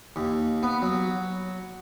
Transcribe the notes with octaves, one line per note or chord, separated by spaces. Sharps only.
D#2
B3
F#3